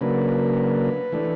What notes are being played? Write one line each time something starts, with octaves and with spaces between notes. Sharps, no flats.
C#3 F#3 A#3 D4 B4
E3 A3 D4